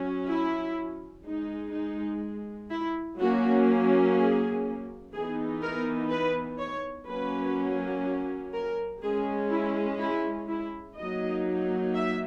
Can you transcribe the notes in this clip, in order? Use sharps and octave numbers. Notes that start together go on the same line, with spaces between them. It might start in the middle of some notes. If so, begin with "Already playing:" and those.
Already playing: F#3 C#4
E4
G#3 D#4
D#4
E4
F#3 A#3 C#4 F#4
G#4
E3 B3 D#4 G#4
A#4
B4
C#5
F#3 A#3 C#4 B4
A#4
G#3 C#4 G#4
E4
E4
E4
F#3 A#3 D#4 D#5
E5